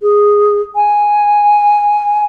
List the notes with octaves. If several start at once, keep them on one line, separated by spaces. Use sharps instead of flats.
G#4
G#5